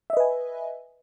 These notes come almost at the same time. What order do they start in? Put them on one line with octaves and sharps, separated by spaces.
E5 D#5 B4 G#5